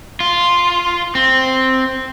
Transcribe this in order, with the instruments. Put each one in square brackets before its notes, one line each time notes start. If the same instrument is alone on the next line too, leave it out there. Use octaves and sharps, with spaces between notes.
[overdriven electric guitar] F4
C4